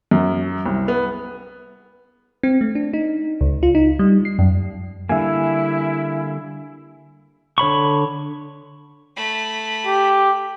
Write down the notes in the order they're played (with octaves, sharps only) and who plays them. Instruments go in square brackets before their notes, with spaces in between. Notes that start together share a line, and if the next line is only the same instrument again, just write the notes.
[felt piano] F#2
C2
B3
[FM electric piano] C4
A3
D4
D#4
C#2
F4
D#4
G3
C7
F#2
[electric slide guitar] D3 G3 A#3 [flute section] E4 [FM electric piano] E5 G#5
[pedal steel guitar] D3 C#5 B5 C#6
[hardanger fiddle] A3 B5
[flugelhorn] G4